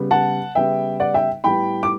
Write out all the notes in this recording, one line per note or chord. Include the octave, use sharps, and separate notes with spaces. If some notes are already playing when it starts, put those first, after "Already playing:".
Already playing: C#3 G3 B3
F#5 A5
C#3 G3 B3 E5 G5
D5 F#5
E5 G5
A2 G3 B3 G5 B5
D6